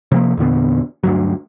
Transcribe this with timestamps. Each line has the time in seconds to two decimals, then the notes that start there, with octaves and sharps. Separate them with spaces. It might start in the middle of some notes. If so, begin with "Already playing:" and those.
0.12 C3 F3 A#3
0.37 E2 A#2 D3 B3
1.04 D2 G2 F#3